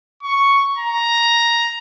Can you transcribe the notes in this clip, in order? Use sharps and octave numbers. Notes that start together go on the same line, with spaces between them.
C#6
A#5